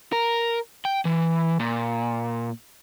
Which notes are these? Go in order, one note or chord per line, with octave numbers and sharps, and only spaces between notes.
A#4
G5
E3
A#2